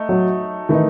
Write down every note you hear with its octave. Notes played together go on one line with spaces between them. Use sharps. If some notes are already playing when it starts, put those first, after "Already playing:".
Already playing: A3 D#4
F#3
D#3 E3 A3 D#4